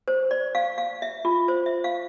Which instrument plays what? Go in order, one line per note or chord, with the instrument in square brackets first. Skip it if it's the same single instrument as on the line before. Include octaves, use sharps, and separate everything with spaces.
[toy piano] C5
D5
F5
F5
E5
F4
C5
E5
F5